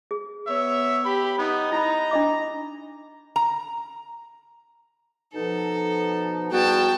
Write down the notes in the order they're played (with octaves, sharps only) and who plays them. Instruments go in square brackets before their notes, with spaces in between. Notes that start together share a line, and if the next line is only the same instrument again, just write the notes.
[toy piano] G#4
[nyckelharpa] B3 C#5 [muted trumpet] E5
[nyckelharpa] G4 [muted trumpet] B5
[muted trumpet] B3 [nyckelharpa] D#4
[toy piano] E4 B5 [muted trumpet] A#5
[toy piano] D4 D#5 D6
[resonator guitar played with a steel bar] A#5
[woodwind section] B2 F3 D#4 [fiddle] A4
[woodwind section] E2 G3 B3 [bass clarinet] F#4 [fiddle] G5 A5